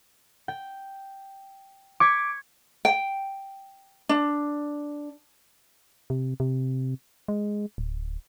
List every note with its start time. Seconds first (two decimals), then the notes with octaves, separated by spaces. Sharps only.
0.48 G5
2.00 C#6 D6 G#6 B6
2.85 G5
4.09 D4
6.10 C3
6.40 C3
7.28 G#3
7.78 D1